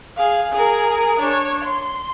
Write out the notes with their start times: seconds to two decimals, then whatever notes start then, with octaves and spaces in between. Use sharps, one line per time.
0.16 G#4 F5
0.52 G#4 A#4
1.20 D4 C#5
1.64 C6